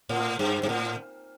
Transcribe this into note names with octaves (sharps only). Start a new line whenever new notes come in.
A2
G2
G2
A2